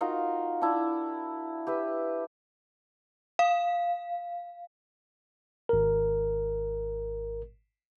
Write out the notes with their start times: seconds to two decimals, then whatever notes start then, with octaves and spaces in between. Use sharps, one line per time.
0.01 D#4 F4 F#4 A#4
0.61 D4 E4
1.67 G4 B4 E5
3.39 F5
5.69 G#1 A#4